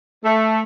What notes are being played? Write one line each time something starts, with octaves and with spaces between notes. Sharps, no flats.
A3